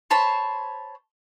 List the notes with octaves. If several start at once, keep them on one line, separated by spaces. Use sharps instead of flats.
C5 C#5 A5 B5